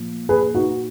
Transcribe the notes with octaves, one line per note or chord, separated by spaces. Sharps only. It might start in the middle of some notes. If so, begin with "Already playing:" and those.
Already playing: A#2 F3
G#4 B4
D#4 F#4